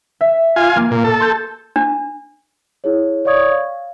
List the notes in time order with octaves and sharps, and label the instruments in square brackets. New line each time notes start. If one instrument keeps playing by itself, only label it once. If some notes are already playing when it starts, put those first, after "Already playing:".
[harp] E5
[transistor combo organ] F4 G#5
[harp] A#3
[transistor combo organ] A#2
A4
[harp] C6 G6
[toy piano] D4
[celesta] E4 G#4 C#5
C#5 D5 F5 C#6 D#6 G#6
F5